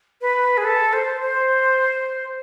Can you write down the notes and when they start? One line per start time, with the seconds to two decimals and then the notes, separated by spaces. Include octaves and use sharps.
0.21 B4
0.58 G#4
0.65 A4
0.93 C5
1.21 C5